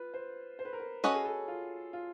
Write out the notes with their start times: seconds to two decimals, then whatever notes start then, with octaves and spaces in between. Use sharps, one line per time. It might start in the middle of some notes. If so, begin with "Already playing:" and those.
Already playing: F4 B4
0.14 C5
0.59 C5
0.65 B4
0.73 A#4
0.80 B4
1.04 C#4 F#4 A4 B4 D#5
1.15 G#4
1.25 A4
1.48 F4
1.93 F4